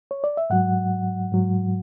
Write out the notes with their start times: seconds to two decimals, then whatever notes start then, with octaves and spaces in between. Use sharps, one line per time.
0.11 C#5
0.24 D5
0.37 E5
0.50 G#2 F#3 F#5
1.32 G#2 F#3